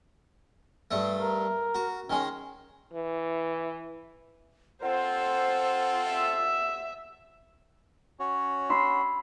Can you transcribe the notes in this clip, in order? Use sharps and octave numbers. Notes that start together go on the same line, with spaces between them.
G2 A3
A#4
F#4
D#3 G#3 C#4
E3
C4 F4 A4 C5 F#5
E5
C#4 F#4 C#5
B5 C6 E6